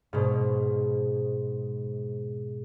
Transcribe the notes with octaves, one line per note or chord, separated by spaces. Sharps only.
G#2 B2